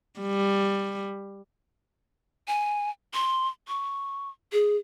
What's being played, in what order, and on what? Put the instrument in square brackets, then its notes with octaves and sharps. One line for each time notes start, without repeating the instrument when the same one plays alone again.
[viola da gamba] G3
[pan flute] G#5
C6
C#6
G#4